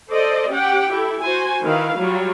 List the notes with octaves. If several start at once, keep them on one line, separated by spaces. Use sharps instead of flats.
A4 C5 D5 D#5
C#4 G4 F#5 G5
E4 G4 A4
F#4 C5 G#5
D#3 E4 B4 F5
F#3 G3 F4